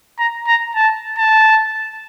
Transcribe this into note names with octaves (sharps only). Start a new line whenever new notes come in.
A#5
A#5
A5
A5